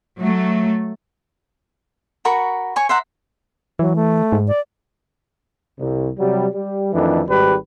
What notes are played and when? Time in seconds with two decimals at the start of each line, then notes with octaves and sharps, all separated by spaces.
0.21 F#3 A3
2.25 F#4 A#4 B5 C#6
2.76 C#5 G#5 C#6
2.89 C5 E5 F#5 A#5
3.79 E3 F#3
3.96 A3
4.32 G#2
4.48 D5
5.79 C2
6.19 C3 F#3 G3
6.54 G3
6.93 F2 D#3 E3 A3 D4
7.27 G#1 G#2 G3 G4 B4